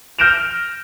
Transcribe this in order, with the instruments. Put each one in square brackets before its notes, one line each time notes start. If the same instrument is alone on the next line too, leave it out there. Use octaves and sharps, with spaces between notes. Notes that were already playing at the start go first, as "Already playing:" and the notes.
[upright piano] F6 G6 A#6 D7 E7 F7